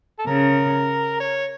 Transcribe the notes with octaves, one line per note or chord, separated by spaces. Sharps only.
A4
C#3 A#4
C#5